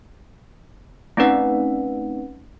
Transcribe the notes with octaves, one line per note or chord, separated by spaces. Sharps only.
A3 C4 C#4 D#4 B4 F#5